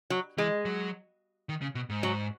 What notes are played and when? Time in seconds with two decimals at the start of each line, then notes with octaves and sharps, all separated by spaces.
0.10 F#3
0.38 E3 G#3
0.65 F#3
1.49 D#3
1.61 C#3
1.75 B2
1.90 G#2
2.03 F#3